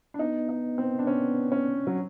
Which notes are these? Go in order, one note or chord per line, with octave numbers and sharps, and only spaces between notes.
D4
B3 D#4
D#4
C4
D4
C#4
C#4
F#3